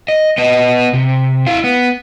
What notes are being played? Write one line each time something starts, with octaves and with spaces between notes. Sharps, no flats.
D#5
B3 D#5
C3
E4 F5
B3